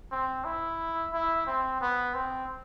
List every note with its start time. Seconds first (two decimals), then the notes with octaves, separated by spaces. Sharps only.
0.12 C4
0.45 E4
1.13 E4
1.47 C4
1.81 B3
2.14 C4